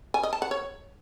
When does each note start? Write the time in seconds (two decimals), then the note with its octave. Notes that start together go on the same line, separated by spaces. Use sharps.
0.14 G#5
0.23 D#5
0.33 A5
0.42 F#5
0.51 C#5